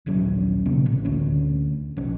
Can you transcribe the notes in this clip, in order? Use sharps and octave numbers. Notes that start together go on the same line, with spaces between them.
D#1 A#1 F#3 C#4
A#2 C#3
A1
D2 C#4
A#1 C#4